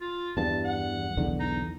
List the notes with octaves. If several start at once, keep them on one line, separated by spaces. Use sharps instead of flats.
F4
E2 G2 A5
F#5
B1 E2 D3
D#4